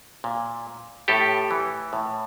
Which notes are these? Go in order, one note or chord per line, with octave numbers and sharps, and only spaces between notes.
A#2
A2 G4 A4
E3
A2